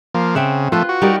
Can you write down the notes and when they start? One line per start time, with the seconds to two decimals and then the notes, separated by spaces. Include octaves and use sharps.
0.14 F3 A#3
0.35 C#3 C4 E5 F#5
0.72 F3 A3 F4 B4
0.89 F#4
1.02 G3 D#4 A#4